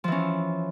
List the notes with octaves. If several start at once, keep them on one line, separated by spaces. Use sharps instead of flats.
E3 F3 C#4